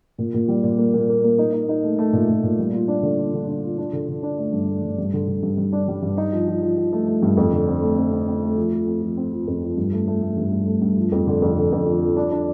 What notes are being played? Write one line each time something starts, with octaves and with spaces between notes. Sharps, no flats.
A#2
A#2
G3
A#2
A#3
A#2
A#3
A#3
D#4
D#4
D#4
A3
A3
A#2
A#2
A#2
G3
F4
D4
D3
F4
D3
D4
F4
D4
D3
D3
D4
A3
G2
A3
G2
G2
D3
D3
G2
G2
D4
G3
G2
D#4
F3
F3
F3
F3
A3
A3
G2
F2
D3
C4
A3
C4
C4
C4
A3
F3
F3
C4
F3
C4
F3
F2
F3
G2
A3
A3
A3
G2
G2
A3
G2
F3
F2
D3
F2
D3
F2
F3
F3
D4
D4